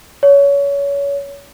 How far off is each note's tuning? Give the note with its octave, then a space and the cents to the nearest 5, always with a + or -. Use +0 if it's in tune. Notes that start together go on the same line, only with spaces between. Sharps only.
C#5 +25